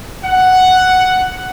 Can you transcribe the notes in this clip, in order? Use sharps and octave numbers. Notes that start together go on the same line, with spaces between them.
F#5